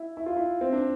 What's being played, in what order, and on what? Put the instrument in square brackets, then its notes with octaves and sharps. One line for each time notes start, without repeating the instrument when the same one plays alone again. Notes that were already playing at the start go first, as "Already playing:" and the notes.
Already playing: [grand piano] E4
E4
F4
E4
C4
D4